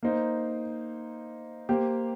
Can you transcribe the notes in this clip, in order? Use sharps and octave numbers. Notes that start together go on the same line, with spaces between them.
A#3 D#4 C5
A#3 G4 C5